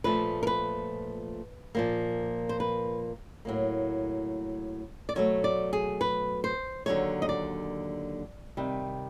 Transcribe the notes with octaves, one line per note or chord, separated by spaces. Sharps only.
A#2 F3 A3 B4
A#4
B4
A#2 F3 A#3
C5
B4
A2 F#3 A#3
D5
B2 F#3 A3 C#5
D5
G#4
B4
C5
D#2 D3 F#3 A3 C#5
D#5
D5
C3 D#3 G3